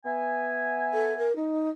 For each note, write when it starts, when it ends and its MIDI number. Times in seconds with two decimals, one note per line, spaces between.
0.05 1.26 59
0.05 1.26 76
0.05 1.26 80
0.93 1.16 69
1.17 1.35 70
1.35 1.69 63